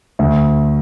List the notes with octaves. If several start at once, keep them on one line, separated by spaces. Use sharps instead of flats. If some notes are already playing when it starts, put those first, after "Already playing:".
D2